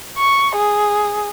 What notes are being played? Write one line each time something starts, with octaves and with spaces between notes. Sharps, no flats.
C#6
G#4